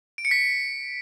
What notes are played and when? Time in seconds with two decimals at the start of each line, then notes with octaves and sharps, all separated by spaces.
0.18 D7
0.25 C#7
0.31 B6